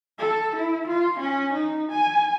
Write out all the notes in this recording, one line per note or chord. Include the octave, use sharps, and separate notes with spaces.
A4
E4
F4
C#4
D#4
G#5